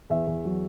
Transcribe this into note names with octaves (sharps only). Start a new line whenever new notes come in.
E2 E5
E2
F#3